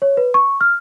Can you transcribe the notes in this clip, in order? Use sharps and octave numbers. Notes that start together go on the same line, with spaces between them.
C#5
B4
C#6
F6